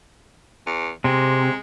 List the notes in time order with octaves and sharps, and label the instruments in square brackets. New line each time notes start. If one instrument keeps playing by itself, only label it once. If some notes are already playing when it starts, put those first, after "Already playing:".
[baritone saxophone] E2
[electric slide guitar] C3 [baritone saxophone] G#3